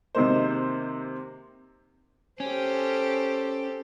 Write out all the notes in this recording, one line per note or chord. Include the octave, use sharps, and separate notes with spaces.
C3 D#3 G#3 A#3 C5
C#4 G4 A4 C5